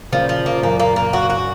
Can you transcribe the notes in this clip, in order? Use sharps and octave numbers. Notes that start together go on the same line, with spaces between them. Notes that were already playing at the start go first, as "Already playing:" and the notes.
A#2 C#3 F3
F3
A#3
F#2 A#2 A#3
A#3
A#3
F#4
F#4